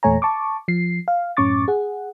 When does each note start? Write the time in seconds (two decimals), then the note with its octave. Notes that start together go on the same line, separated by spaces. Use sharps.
0.03 E2 A#2 A3 C#5 G#5 A#5
0.22 A5 C#6 D6
0.68 F3 C7
1.08 F5
1.37 F#2 A2 C#4 C#6 D6 A6
1.68 G#4 F#5